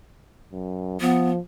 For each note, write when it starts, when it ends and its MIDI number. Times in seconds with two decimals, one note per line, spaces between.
0.52 0.96 42
1.01 1.39 53
1.01 1.30 59